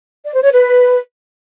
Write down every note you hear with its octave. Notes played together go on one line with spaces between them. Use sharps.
D5
C5
C#5
B4